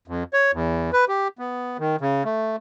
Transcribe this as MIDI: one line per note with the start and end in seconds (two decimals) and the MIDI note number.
0.08 0.23 41
0.33 0.51 73
0.53 0.90 40
0.93 1.05 71
1.08 1.28 67
1.39 1.77 59
1.79 1.96 51
2.01 2.23 49
2.25 2.56 57